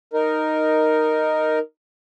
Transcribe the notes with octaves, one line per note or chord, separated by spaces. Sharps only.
D#4 A#4